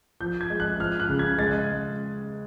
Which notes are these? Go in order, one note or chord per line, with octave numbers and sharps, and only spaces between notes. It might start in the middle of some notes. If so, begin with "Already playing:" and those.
F3 G6
G#6
G#3
F#6
F3 F6
F#6
C#3
G#6
G#3 A6